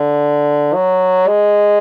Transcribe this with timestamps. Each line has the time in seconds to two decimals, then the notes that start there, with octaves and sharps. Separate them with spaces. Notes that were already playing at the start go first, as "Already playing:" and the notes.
Already playing: D3
0.74 F#3
1.28 G#3